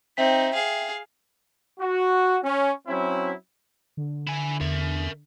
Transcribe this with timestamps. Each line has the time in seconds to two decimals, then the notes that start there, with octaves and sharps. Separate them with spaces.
0.17 C4 D#4 E5 G5 B6
0.54 G#4 F5
1.80 F#4
2.44 C#4
2.88 F#3 C4 C#4 E4
3.97 D3
4.27 E4 G#5
4.61 E2 A#4 E5